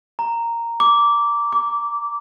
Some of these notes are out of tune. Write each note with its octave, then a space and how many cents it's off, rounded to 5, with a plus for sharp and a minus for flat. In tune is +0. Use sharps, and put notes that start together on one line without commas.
A#5 -5
D6 -15
D6 -30